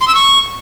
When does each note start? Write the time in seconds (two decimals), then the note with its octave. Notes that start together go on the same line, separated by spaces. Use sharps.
0.01 C6
0.08 E6
0.15 C#6